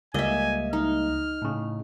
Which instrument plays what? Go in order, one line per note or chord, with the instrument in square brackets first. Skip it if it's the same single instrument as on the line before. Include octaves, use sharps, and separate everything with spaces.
[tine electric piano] C#2 G3 A#3 [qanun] D#5 E5 [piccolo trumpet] G#5
[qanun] D#4 [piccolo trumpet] F6
[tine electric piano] A2 C#3